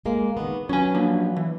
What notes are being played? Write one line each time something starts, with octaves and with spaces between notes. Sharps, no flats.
G#3 A#3
D#3 B3
F#3 C#4 B4 G#5
F3 A#3 D4
E3